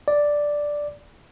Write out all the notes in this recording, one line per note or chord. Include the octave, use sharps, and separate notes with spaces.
D5